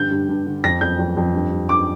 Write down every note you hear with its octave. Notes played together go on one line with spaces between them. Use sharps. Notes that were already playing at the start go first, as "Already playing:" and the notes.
Already playing: G2 D3 G6
G2
G2
D3
F2 A#6
F2 G6
F2
F2
G2
G2
G2 D6